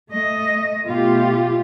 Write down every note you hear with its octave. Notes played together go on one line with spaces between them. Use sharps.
A3 D#5
B2 A3 F4 G4